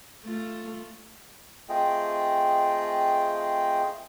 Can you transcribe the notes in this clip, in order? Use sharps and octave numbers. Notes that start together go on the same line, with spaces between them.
A3 F4
A3 C4 F4 G#4 D#5 G5